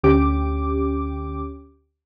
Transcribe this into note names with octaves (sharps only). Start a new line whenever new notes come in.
D2 C#4 G4 D6